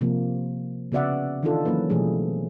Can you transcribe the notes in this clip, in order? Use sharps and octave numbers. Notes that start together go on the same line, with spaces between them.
C3 F3 A#3
C#3 B3 F#4 D5 E5 F#5
D#3 E3 D4 D#4 F4 A4
E3 F#3 A#3 C#4 B4
B2 E3 F3 G3 A3 G#4